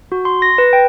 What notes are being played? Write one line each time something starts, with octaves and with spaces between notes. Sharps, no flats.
F#4
C6
A#6
B4
G5